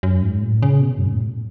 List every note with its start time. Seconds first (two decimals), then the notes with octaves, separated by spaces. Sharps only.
0.03 F#2
0.22 G#2
0.42 A2
0.63 C#3
0.81 B2
0.98 F#2
1.06 G#2
1.13 A2
1.21 B2